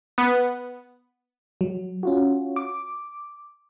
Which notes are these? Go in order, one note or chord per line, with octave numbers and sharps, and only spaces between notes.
B3
F#3
C#4 F4 F#4
D6